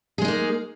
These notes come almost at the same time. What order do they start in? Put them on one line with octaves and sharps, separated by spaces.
G#4 G#3 D#4 A#3